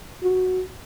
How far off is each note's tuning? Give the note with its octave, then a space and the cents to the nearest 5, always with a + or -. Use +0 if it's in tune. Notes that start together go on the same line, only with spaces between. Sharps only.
F#4 +0